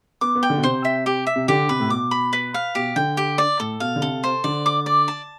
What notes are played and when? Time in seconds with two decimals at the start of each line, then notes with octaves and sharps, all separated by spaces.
0.21 B3 D6
0.35 B3
0.43 G5
0.50 D3
0.58 B2
0.63 C3 C5
0.85 E5
1.06 G4
1.27 E5
1.36 C3
1.48 D3 G4
1.69 C3 B4
1.80 A2
1.90 B2 D6
2.11 B5
2.33 B4
2.54 F5
2.75 B2 G4
2.96 D3 G5
3.17 G4
3.38 D5
3.60 A2 A4
3.80 B2 F5
3.96 D3
4.01 C3 A4
4.24 C5
4.44 D3 D5
4.66 D6
4.86 D5
5.08 A5